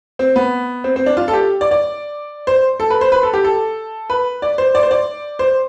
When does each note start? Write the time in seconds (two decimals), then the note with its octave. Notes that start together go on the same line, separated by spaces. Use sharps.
0.19 C4
0.36 B3
0.84 C4
0.96 C4
1.06 D4
1.17 F4
1.28 A4
1.33 G4
1.61 D5
1.71 D5
2.47 C5
2.80 A4
2.90 B4
3.01 C5
3.12 B4
3.23 A4
3.33 G4
3.44 A4
4.10 B4
4.42 D5
4.58 C5
4.75 D5
4.83 C5
4.91 D5
5.39 C5